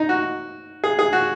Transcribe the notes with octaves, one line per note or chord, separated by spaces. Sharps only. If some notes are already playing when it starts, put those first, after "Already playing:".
Already playing: D#4
F#4
G#4
G#4
F#4